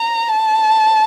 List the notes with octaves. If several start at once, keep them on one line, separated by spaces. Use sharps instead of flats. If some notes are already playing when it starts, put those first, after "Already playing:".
Already playing: A#5
A5